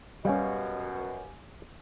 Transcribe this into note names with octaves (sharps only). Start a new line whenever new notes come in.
F#2 B2 G3 C#4 G4 F5 G#5